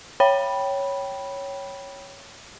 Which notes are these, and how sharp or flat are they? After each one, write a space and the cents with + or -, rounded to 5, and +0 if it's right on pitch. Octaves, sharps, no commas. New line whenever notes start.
C#5 +0 G5 -10 B5 -10